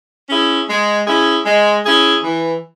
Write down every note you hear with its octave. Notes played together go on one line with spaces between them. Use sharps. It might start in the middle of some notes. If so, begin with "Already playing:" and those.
C#4 E4 G#4
G#3
C#4 E4 G#4
G#3
C#4 E4 G#4
E3